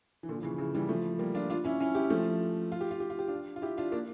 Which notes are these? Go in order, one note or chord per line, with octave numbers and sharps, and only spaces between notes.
E3
A#2 D3
F3
C#3 E3
C#3 E3
E3 G3
F3 A3
G3 A#3
D4 F4
D4 F4
C#4 E4
C#4 E4
E4 G4
F3 A3
F4
G4
F4
G4
F4
G4
D4 F4
F4
E4 G4
D4 F4
A#3 D4